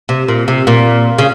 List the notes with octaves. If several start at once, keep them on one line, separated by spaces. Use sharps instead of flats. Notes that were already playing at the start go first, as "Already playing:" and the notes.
C3
A#2
C3
A#2
C#3